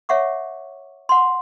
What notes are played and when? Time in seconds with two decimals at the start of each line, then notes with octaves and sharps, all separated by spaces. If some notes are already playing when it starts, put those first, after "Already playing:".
0.09 C#5 E5 F#5 C#6 D6
1.09 F#5 C6